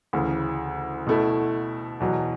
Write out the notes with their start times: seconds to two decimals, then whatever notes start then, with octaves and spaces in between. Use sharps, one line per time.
0.13 D2 C#3 E3
1.07 B2 A3 E4
2.00 E2 B2 F#3